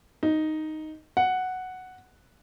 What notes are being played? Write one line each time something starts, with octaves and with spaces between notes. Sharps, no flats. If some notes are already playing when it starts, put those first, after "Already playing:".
D#4
F#5